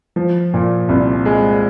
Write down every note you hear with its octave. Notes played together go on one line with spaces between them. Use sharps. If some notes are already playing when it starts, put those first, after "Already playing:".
F3
A#2
C2
G#3